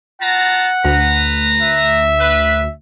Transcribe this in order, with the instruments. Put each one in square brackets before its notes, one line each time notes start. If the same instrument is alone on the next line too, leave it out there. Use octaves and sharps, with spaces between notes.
[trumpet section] F4 A5 A#5 [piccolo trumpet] F#5
[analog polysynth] D2 [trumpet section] B4 A#5
[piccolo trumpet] E5
[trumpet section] B4